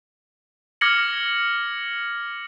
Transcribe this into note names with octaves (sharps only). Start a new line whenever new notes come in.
D6 F6 G#6 A#6 C#7 F#7